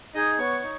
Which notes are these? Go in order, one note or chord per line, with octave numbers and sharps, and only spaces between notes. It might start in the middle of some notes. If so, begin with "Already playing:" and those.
D#4 G#4 D#5 D#6
B3 C#5 C#6
D#4